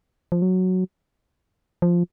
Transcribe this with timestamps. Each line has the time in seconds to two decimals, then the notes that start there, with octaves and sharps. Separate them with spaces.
0.32 F3
0.42 F#3
1.82 F3